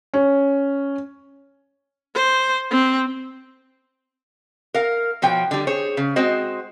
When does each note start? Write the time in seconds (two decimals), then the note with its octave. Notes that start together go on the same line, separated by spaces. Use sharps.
0.14 C#4
2.15 C5
2.71 C4
4.74 A#4 F5
5.22 B2 F3 C#5 G5
5.51 D3 G3
5.67 G#4 C5 C#5
5.97 C#3
6.16 G#3 C4 F#4 C5 D#5